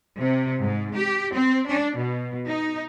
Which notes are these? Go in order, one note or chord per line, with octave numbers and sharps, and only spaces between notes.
C3
G#2
G4
C4
D4
B2
D#4